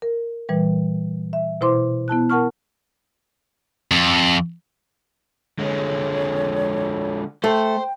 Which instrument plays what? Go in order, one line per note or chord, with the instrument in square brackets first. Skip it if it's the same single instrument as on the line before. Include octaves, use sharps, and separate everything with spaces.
[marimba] A#4
A#2 E3 G3 B4
E5
B2 E4 C5 C6 D6
B3 E4 A5 F#6
A#4 F#5 A5 C#6 F6
[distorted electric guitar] F2
[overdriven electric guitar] D3 G#3 [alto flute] C#5
[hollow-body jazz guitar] A3 [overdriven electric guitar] C5 [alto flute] G5